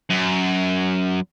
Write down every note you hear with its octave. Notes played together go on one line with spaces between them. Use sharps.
F#2